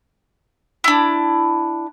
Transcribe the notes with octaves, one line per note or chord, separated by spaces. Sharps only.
D4 E4